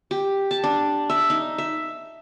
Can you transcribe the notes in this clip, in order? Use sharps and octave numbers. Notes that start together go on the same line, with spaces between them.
G4
A5
D4
E5
D#4
E5